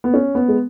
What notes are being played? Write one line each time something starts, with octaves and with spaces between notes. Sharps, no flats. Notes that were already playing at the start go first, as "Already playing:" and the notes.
B3
C#4
B3
G#3